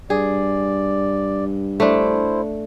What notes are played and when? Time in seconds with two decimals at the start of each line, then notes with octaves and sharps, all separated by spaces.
0.10 G2 G#4 D5
1.80 A3 D4 E4 C5